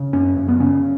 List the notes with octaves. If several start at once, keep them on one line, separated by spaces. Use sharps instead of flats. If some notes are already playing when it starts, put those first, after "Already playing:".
Already playing: C#3
F#2 C#4
F#2
B3
C#3 C#4